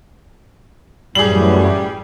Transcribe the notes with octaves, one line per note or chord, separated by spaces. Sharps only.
F#2 A2 E3 G3 G#4 F#7